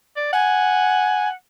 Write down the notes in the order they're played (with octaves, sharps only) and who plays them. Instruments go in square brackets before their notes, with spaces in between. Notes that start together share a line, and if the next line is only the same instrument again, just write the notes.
[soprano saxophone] D5
[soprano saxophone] F#5 [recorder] G#5